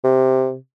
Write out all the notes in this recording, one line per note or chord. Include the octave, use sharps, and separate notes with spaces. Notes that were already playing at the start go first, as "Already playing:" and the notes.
C3